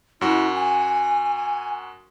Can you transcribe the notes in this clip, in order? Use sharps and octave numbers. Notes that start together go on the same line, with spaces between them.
F#2 E4 F#4
G#5